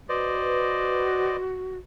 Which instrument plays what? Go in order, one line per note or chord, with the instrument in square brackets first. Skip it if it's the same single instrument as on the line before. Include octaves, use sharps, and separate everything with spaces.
[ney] F#4 [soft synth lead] B4 [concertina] C5 D5 D#5